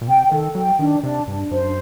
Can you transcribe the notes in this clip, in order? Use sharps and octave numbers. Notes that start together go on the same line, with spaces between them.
A#2
C3 G5
D#3 A4
F#3 G5
D#3 D4
C3 D4
G2 D4
F#2 C5